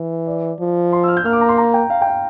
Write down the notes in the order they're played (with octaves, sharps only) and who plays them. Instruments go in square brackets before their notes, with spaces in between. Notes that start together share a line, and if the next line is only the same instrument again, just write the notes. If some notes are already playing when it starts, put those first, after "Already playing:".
Already playing: [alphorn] E3
[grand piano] D5
[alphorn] F3
[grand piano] C6
E6
F6
G6
[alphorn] A#3 [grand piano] F6
[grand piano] D6
A#5
C6
A#5
G5
F5
G5
F5